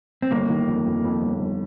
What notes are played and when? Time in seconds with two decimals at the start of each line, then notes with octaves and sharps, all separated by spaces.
0.22 C4
0.31 G1 A#3
0.50 D#3
0.68 F2
0.86 F2
1.04 F2
1.22 G1
1.40 G1